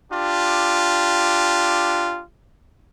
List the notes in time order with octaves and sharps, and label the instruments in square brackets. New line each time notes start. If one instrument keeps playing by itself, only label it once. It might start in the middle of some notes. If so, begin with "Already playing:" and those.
[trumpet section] D4 F4 G4